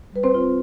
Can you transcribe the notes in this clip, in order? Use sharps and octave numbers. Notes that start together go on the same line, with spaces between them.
G3 B4
C4 C5
F4